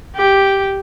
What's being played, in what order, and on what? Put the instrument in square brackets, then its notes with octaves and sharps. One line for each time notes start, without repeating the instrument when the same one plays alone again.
[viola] G4